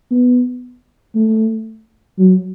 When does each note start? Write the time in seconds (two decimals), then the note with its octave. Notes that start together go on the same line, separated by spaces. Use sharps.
0.11 B3
1.15 A3
2.19 F#3